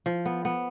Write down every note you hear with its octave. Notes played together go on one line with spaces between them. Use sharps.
F3
B3
B3